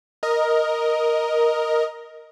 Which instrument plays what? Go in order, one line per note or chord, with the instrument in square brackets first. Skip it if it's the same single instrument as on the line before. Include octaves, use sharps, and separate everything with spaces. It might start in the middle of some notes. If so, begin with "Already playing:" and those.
[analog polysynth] A#4 D#5